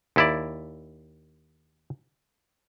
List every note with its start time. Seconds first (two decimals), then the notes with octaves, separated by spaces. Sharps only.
0.16 D#2 E4 D5